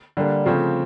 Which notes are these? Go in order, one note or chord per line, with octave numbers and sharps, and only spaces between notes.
D3 G3 A#3 D4
C#3 F3 A3 C4